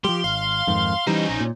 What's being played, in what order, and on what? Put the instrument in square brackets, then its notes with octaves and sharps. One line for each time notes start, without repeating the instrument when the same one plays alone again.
[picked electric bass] F3 G3 [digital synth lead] G4 [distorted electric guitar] C6
[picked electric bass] G#1 [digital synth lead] F5
[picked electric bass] F2 G#2 D#3
[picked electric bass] E3 G3 [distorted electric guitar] C#4 C5 [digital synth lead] D#4
[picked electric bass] A#1
A#2